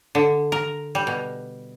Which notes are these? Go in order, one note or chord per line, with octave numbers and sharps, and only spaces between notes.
D3
A#4
G3
B2